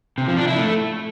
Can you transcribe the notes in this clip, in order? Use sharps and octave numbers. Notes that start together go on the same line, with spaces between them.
C3
F3
D4
E4
A3